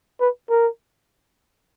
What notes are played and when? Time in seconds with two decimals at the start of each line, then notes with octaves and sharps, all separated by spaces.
0.20 B4
0.50 A#4